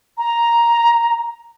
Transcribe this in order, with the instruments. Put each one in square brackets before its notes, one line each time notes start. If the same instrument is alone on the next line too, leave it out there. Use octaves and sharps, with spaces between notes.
[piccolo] A#5